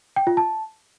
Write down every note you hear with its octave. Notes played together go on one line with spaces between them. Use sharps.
G5
F4
A5